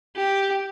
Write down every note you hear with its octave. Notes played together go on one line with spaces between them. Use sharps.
G4